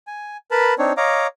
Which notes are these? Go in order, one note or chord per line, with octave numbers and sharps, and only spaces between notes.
G#5
A#4 B4 A5 B5
C4 D4 D#4 C#5
C#5 D#5 F5 A#5 D6